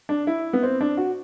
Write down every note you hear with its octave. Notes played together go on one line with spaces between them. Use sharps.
D4
E4
B3
C4
D4
F#4